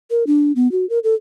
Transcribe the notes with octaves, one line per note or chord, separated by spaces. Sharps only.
A#4
D4
B3
F#4
A#4
A4